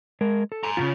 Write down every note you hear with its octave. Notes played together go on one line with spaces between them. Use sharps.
G#3 A#4
A4
G#5 A#5
D#2 C#3 F4